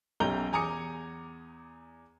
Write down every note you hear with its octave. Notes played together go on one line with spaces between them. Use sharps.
B1 F#2 G4 A#5 G6 G7
E2 G#5 A#5 D6 D#6 C#7